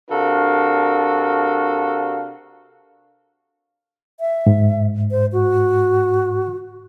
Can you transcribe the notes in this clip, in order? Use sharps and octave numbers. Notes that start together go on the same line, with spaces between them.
C3 D4 F#4 A4 A#4 F5
E5
G#2
C5
F#4